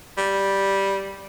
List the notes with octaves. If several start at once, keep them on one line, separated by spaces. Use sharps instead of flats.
G3